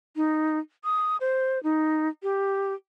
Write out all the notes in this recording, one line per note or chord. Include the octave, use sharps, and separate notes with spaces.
D#4
D#6
C5
D#4
G4